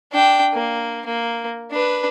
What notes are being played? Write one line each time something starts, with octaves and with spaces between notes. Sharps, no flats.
D4 G5
A#3
A#3
D4 B4